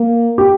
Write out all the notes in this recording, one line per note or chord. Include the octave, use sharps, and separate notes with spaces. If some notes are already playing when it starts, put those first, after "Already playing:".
Already playing: A#3
G4